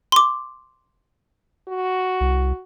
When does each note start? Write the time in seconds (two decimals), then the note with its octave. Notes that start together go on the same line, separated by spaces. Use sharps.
0.12 C6 D6
1.68 F#4
2.20 C2